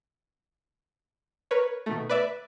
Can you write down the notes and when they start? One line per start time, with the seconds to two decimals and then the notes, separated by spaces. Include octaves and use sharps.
1.51 A#4 B4 C#5
1.86 B2 D#3 A3
2.10 B4 D5 E5